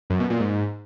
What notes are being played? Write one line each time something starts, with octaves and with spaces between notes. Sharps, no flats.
F#2
B2
A#2
G#2